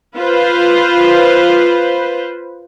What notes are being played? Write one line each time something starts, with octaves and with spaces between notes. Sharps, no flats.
F4 B4 C5